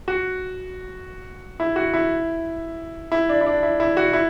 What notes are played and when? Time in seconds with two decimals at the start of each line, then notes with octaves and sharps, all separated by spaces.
0.08 F#4
1.60 E4
1.76 F#4
1.94 E4
3.12 E4
3.29 D4
3.41 E4
3.46 D4
3.63 E4
3.80 E4
3.97 F#4
4.13 E4